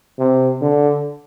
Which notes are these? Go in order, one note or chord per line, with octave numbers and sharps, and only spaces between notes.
C3
D3